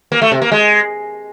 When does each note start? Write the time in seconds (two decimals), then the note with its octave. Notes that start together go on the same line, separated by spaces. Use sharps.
0.12 A#3
0.22 A3
0.32 C3
0.42 A#3
0.52 G#3